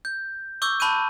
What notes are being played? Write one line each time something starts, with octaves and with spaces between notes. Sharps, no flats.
G6
C#6 D6 E6 G6
A5 B5 C#6 F#6 G6 D#7